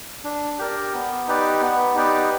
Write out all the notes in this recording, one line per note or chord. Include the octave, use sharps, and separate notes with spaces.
D4
G4 A#4 D5
B3
D#4 G4 B4 D5
B3
D#4 G4 B4 D5